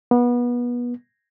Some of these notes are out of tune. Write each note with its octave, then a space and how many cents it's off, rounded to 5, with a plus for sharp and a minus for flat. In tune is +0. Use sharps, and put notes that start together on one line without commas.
B3 -25